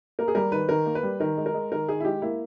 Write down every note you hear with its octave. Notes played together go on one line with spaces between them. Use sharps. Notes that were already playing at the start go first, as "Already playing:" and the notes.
A#3 A#4
G#4
G3 A#4
D#3 B4
D#3 A#4
A#3
B4
G3
D#3 A#4
G#3
A#4
G#3
D#3 A#4
D#3 G#4
E4
G#3 G4
A#3 E4